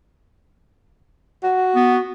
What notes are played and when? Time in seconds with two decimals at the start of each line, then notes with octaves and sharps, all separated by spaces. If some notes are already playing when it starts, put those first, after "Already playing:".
1.43 F#4
1.75 B3